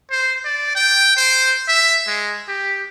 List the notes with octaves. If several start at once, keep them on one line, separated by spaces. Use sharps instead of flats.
C5
D5
G5
C5
E5
G#3
G4